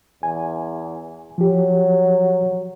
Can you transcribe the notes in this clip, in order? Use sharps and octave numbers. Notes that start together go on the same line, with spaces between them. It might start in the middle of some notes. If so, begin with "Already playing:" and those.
E2 G#5
F3 F#3 G4